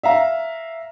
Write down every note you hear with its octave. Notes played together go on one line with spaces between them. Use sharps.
E5 F5 A#5